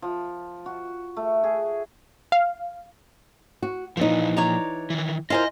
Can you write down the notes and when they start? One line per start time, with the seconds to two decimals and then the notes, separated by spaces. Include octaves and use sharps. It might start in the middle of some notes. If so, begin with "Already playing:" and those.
0.02 F3
0.66 F#4
1.17 A3
1.44 G#4
2.32 F5
3.62 F#4
3.97 A#2 E3 F3 D#4
4.37 C#5 D5 A#5
4.90 D#3 E3
5.30 E4 F4 A#4 C5 D#5 G#5